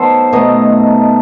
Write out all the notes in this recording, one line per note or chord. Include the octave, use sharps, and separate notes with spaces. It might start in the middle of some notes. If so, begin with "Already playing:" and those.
Already playing: F#3 B3 D#4 A4 C5
B2 A3 D#4 D#5